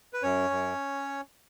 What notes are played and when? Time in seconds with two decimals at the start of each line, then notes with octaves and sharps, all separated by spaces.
0.13 B4
0.23 F#2 C#4 C#5
0.50 F#2